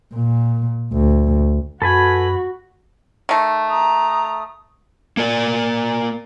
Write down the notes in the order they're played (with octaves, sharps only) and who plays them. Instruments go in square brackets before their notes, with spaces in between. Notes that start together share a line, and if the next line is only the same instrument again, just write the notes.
[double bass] A#2
D2
[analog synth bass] F#2 [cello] F#4 [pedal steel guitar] A4 B4 G#5 [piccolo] B5
[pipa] D#3 A3
[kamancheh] A#5 [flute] D#6
[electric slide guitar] A#3 A#4 D5